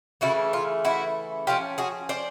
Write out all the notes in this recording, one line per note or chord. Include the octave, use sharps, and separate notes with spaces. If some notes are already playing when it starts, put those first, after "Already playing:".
C#3 E3 A3 E4 F#4
F4
E4 F#4
F3 A3 C#4 F4 G4
F#4 G#4
C5 D5